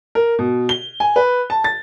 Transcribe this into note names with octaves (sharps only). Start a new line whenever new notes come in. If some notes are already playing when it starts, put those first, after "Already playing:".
A#4
B2
G7
G#5
B4
A5
A6